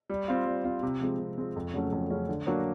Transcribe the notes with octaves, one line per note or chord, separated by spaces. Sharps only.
G3
C4 F4
G3
C4 F4
C3
F3 G#3 C4
C3
F3 G#3 C4
F2
C#3 F#3 A3 C#4
F2
C#3 F#3 A3 C#4
D3
F#3 A#3 D4 F#4